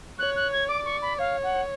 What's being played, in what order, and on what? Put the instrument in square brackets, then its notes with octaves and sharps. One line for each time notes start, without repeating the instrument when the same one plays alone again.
[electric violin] C#5 [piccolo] F#6
[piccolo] F#6
G#6
[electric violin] D5 [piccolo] D6
[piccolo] C#6
B5
[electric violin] C#5 [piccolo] F5
[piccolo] F#5